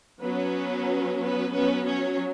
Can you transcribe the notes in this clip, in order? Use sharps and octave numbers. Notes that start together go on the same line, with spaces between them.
F#3 B3 C#4 B4
B3 B4
F#3 B3 C#4 B4
C#4 C#5